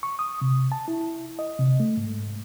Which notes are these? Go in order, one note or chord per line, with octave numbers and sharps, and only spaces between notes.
C#6
D#6
C3
A5
E4
D#5
C3
A3
G#2